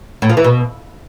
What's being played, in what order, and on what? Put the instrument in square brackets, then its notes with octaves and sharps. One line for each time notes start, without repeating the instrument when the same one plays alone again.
[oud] A2
F3
E3
B2